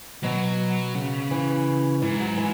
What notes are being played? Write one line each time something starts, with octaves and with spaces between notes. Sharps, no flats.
B2 F#3
C#3
E3
G#2 E3
F#3
E3